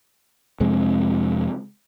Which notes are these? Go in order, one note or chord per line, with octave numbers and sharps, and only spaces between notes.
F2 C3 G#3